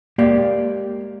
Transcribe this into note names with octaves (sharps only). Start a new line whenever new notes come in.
G#3 A#3 G4 D5 F5